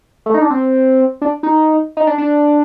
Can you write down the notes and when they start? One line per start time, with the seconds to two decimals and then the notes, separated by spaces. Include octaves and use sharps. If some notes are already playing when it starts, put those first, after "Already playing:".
0.26 A3
0.34 D#4
0.41 D4
0.50 C4
1.22 D4
1.43 D#4
1.97 D#4
2.07 D4
2.18 D4